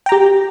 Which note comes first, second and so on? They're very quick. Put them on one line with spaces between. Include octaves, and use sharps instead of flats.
G5 A#5 G4